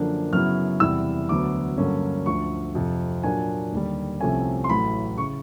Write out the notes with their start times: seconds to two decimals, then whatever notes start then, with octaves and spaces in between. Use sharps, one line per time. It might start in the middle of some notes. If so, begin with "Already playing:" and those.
Already playing: F#2 D3 F3 A#3 D4
0.33 F#2 C#3 F#3 B3 E4 F6
0.80 E2 C3 E3 G3 E6
1.29 D2 D3 F#3 B3 D6
1.78 G2 D3 F#3 A#3 C#4
2.26 D2 D3 F3 C#6
2.75 F2 C3 F3
3.23 A#2 F#3 A#3 D4 G#5
3.72 D#2 D3 G3
4.21 C2 C3 F3 A3 C#4 G#5
4.64 C6
4.69 A1 A2 F#3 B5
5.18 C#3 C#6